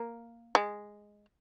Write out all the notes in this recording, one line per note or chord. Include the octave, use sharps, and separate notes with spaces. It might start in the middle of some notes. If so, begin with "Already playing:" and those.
Already playing: A#3
G#3